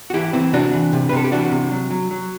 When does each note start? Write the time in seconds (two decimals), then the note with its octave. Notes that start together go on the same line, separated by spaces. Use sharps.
0.10 F#4
0.14 E3 E4 G4
0.33 E3 C4 E4
0.53 C3 D4 F#4
0.73 E3
0.93 C3
1.09 B4
1.13 C3 A4
1.24 G4
1.32 E3 D4 F#4
1.52 C3
1.71 F#3
1.90 F#3
2.11 F#3